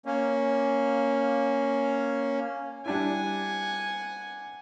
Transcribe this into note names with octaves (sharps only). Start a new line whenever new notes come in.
A#3 C#4
G3 D4 E4 F#5 G#5